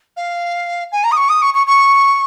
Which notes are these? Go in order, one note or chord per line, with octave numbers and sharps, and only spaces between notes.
F5
G#5
A#5
D#6
C#6
D#6
C#6
C#6
C#6